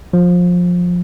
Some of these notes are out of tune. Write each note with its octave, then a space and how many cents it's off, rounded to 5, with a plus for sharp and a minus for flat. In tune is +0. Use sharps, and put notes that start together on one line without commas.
F3 +20